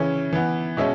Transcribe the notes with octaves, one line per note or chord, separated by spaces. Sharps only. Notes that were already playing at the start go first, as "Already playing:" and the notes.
Already playing: C#3 E3 C#4
E3 B3
B2 G#3 C#4 E5